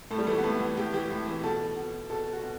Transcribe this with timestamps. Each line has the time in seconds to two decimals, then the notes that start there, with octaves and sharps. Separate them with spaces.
0.11 A2 A3
0.19 G3
0.27 E3 A3
0.38 B3
0.44 A2 A3
0.60 E3 B3
0.77 A2 G4
0.94 E3 G4
1.11 A2
1.27 E3
1.44 B2 A4
1.77 B2
2.10 B2 A4
2.33 F#4
2.43 B2